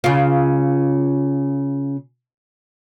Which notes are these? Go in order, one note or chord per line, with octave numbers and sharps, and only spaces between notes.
C#3 F4